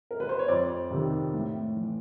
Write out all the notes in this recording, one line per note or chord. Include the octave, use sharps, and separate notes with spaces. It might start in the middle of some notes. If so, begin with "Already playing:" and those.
A#4
B4
C5
C#5
F2 C5 D5
C3 D#3
A2
E3